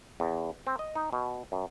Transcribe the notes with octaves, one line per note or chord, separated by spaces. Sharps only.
E2
C4
D#5
D#4
B2
F#2